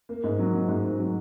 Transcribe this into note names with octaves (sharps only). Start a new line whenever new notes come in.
A#3
G#2
F#3
F#3
G#2
G#2
F#3